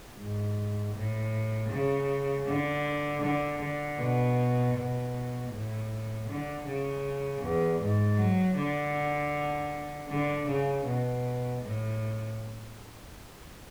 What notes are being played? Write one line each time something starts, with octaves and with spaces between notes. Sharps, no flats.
G#2
A2
C#3
D3
D3
D3
B2
B2
A2
D3
C#3
E2
G#2
F#3
D3
D3
C#3
B2
A2